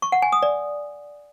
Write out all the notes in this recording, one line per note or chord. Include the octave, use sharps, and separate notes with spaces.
C#6
F#5
G#5
D#6
D5